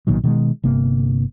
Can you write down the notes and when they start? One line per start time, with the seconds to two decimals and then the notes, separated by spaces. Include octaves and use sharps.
0.07 B1 A#2 D#3 F#3
0.24 B2 D#3 F3 G#3
0.63 G1 C3 A#3